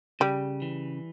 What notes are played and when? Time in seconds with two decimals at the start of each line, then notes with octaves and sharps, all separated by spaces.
0.20 C#3 G3
0.62 E3